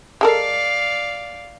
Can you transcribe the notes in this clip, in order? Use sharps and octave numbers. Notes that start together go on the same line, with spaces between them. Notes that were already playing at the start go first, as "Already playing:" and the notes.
G#3 A4 A#4 D5 F5